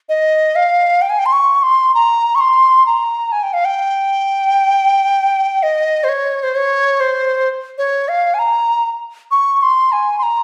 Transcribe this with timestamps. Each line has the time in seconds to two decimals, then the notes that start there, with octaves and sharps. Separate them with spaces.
0.09 D#5
0.55 F5
1.02 G5
1.09 G#5
1.19 G5
1.26 C6
1.32 C#6
1.62 C6
1.94 A#5
2.35 C#6
2.40 C6
2.86 A#5
3.32 G#5
3.43 G5
3.53 F5
3.65 G5
5.63 D#5
6.04 C5
6.09 C#5
6.43 C5
6.55 C#5
7.00 C5
7.78 C#5
8.08 F5
8.34 G#5
8.39 A#5
9.31 C#6
9.62 C6
9.92 G#5
10.18 C6
10.23 A#5